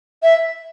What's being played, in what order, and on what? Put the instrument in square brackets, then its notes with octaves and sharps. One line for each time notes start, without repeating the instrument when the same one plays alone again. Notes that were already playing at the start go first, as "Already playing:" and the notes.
[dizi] E5